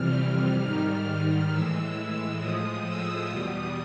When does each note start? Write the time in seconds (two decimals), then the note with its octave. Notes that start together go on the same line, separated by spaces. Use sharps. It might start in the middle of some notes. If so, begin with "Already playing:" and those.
Already playing: F2 C3 E3 G3 F6
0.61 G#2 D#3 G3
1.51 A2 E3 G#3 E6
2.40 A2 F3 G#3 D#6
2.85 E6
3.29 E2 B2 G3 D#6